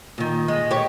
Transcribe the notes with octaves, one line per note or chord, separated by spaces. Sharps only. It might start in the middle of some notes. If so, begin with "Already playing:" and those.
A#2 D#3
G#3
G4 C#5